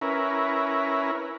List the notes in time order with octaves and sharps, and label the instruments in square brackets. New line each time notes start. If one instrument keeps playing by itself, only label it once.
[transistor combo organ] C#4 E4 A#4 B4